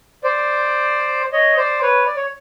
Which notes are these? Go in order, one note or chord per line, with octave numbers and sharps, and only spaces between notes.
C5 D5
C#5 D#5
C5 D5
B4 C#5
D5
C#5